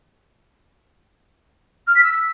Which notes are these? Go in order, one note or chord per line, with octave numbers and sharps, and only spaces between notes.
F6
B6
E6